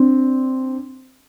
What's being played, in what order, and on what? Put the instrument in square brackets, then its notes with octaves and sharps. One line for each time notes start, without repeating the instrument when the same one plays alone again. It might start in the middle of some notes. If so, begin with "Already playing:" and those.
Already playing: [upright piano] C4 D4